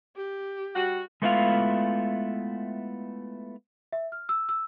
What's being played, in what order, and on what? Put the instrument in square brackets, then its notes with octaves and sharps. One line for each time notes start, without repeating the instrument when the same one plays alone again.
[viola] G4
[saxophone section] G3 F#4
[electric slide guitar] G#3 A3 B3 E4 F4 F5
[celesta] E5
F6
E6
E6